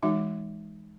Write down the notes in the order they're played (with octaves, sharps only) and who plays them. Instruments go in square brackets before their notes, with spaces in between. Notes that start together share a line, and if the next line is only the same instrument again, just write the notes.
[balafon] E3 G#3 D#4 F#4 E5 D6